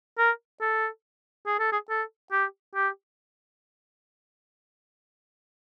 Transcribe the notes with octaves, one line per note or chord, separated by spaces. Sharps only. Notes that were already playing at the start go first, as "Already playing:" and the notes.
A#4
A4
G#4
A4
G#4
A4
G4
G4